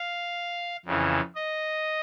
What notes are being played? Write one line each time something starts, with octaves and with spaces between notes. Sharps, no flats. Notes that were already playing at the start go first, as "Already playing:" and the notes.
Already playing: F5
F2 C#3 E3
D#5